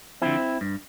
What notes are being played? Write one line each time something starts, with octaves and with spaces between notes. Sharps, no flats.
D3 F3 C4 E4
G2